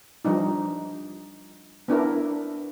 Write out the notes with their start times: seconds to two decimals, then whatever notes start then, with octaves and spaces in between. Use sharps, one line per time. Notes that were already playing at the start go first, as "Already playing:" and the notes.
0.25 F3 G3 D4 D#4
1.88 B3 D4 E4 A#4